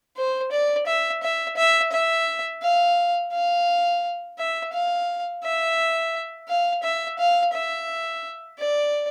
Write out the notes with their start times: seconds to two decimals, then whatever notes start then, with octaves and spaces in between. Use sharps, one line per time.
0.16 C5
0.52 D5
0.86 E5
1.23 E5
1.56 E5
1.92 E5
2.62 F5
3.33 F5
4.38 E5
4.73 F5
5.44 E5
6.48 F5
6.83 E5
7.19 F5
7.53 E5
8.59 D5